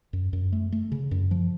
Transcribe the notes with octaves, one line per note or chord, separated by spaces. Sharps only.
F#2
F#2
A3
A3
C#3
F#2
F3